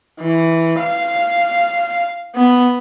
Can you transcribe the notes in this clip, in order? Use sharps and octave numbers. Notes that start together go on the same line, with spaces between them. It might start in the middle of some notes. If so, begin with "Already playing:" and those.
E3
F5
B3